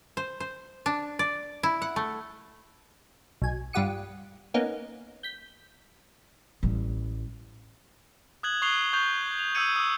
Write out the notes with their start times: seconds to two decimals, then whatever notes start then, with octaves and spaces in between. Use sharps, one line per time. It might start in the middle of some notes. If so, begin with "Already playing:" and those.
0.17 C5
0.40 C5
0.86 D4
1.19 D5
1.63 E4
1.82 F#5
1.96 A3
3.42 B1 G#5
3.73 G2 F4 G4 F#5 D#6 C#7
4.54 A#3 B3 C#4 D#4
5.23 G6 B6
6.63 A1 G3
8.43 D#6 F#6 G#6 F#7
8.62 C#6 D#6 F#6 C7 F7 G7
8.93 C#6 G6 F7
9.39 F7
9.55 D#6 E6 G6 G#6 C#7 D#7
9.76 D#6 E6